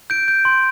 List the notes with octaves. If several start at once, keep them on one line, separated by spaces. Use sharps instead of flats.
G6 D7
G6
C6